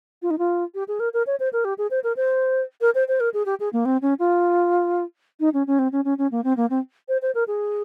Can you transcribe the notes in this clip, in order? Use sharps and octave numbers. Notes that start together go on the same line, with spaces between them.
F4
D#4
F4
G4
G#4
A#4
A#4
C#5
C5
A#4
G4
G#4
C5
A#4
C5
A#4
C5
C5
A#4
G#4
G4
G#4
A#3
C4
C#4
F4
D#4
C#4
C#4
C4
C#4
C#4
C#4
A#3
C4
A#3
C4
C5
C5
A#4
G#4